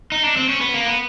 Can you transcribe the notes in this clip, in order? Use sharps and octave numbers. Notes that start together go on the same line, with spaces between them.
D#4
D4
C4
C#4
B3
A#3
B3